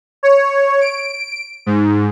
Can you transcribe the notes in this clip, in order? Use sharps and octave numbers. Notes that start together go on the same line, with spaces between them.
C#5
D7
G#2